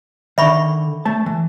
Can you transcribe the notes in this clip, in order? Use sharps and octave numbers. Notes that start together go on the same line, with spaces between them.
D3 D#3 E5 B5 C#6
A3 A5
E3